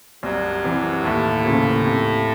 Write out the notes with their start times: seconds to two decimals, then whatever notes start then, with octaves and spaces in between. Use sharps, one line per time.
0.23 C2 F#2 F#3
0.64 C3 E3
1.03 D#2 A2 A3
1.44 C#3 F3 A#3
1.84 C3